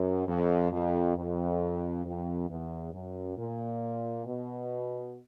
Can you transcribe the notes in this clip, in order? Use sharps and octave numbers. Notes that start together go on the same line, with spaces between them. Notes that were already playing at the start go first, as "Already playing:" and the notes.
Already playing: F#2
F2
F2
F2
F2
E2
F#2
A#2
B2